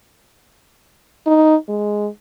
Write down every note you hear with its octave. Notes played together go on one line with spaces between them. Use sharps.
D#4
G#3